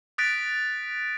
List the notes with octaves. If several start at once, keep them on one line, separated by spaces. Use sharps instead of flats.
D#6 F#6 A6 B6 D7